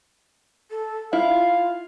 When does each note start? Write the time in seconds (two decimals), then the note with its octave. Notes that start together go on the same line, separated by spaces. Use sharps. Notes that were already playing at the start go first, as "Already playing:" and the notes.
0.71 A4
1.13 E4 F4 F5